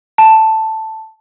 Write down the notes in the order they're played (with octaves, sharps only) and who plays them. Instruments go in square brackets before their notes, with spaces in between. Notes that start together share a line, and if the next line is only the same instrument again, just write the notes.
[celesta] A5